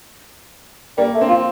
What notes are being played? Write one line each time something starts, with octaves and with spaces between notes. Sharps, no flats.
G3 A#3
A3
C4
F4